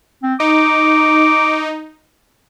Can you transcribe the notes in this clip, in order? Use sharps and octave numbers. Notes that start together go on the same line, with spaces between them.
C4
D#4 D6